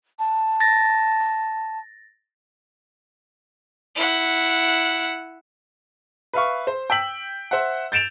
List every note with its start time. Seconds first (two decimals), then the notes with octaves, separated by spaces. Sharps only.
0.19 A5
0.60 A6 A#6
3.95 E4 F#5
6.33 B4 E5 F5 C#6
6.67 C5
6.90 G5 E6 B6 F#7
7.51 C5 E5 F#5
7.92 G6 A6 D7 E7 F7